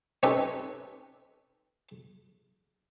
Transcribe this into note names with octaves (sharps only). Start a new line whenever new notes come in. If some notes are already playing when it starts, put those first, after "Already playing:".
C4 C#4 D#4 G4 A4 B4